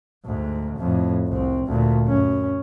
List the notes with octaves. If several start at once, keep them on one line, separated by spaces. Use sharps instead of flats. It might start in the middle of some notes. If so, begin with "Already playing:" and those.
D2 G#2
F2 A2
C2 C4
D2 A#2
F#2 C#4